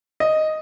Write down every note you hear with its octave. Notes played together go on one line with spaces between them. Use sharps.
D#5